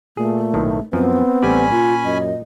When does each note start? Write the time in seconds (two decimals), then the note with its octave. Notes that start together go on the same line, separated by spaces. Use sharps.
0.17 A#2 A3 G#4
0.54 B1 A2 D#3
0.93 F#2 F3 B3 C4
1.43 A1 G3 C#4 D5 G#5 B5
1.72 A#2 F4
2.04 F#2 D#5